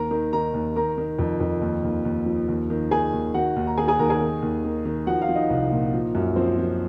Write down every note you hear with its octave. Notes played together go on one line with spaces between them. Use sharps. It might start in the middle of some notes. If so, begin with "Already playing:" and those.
Already playing: D#2 A#4 A#5
D#3
D#3 A#4 A#5
D#2
D#3 A#4 A#5
D#3
F2
F2
D#2
D#2
D#2
F3
D#2
D#3
D#3 G#4 G#5
D#2
D#3 F#4 F#5
D#2
A#5
D#3 G#4 G#5
G#4 G#5
D#2 A#4 A#5
G#4 G#5
D#3
D#2
D#3
D#3
F3 F#4 F#5
F4 F5
F3
D#4 D#5
C2
A#2
F3
F#2
F3 C4 C5
F3